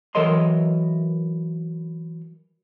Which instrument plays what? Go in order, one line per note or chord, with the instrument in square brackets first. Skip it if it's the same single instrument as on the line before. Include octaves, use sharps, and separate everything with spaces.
[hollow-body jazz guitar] E3 F#3 A4 A#4 D#5 C6